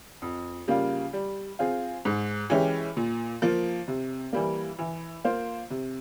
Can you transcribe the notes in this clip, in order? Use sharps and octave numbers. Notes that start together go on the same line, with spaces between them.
F2
C#3 G3 A#3 F4
G3
C4 F4 G#4
G#2
E3 G#3 C#4 G4
A#2
F3 A#3
C3
E3 G3 A#3
E3
A#3 F4 C5
C3